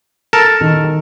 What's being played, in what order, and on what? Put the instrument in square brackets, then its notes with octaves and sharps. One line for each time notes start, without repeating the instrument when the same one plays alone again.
[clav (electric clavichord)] A4 A#4 A5
[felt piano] D#3